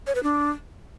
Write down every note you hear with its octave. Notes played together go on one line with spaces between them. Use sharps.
C#5
B4
D4